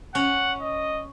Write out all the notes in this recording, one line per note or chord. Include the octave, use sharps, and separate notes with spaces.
C#4 F#5
D#5